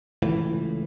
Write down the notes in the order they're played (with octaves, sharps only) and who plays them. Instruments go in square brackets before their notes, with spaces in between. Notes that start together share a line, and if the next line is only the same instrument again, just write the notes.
[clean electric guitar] C#2 A2 E3